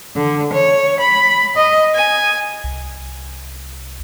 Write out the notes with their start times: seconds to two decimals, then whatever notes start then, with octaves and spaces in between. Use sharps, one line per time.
0.15 D3
0.52 C#5
0.99 B5
1.56 D#5
1.94 G#5
2.64 C2